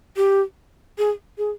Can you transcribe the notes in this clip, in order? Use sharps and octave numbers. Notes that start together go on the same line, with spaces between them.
G4
G#4
G#4